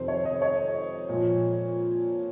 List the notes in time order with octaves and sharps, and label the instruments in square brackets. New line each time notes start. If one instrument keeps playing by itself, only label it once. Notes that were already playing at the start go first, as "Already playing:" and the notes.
Already playing: [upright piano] F2 C3 D#3 C5
C#5
D#5
C#5
A#2 F3